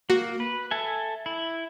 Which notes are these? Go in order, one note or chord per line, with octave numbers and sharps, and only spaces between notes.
A#3 F#4
B4
A4 E5 G#5
E4